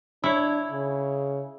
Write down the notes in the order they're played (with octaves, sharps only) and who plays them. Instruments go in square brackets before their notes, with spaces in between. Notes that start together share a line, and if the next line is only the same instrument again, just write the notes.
[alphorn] D4 [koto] E4 C#5
[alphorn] C#3